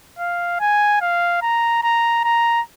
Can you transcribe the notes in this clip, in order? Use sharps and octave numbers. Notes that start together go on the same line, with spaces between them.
F5
G#5
F5
A#5
A#5
A#5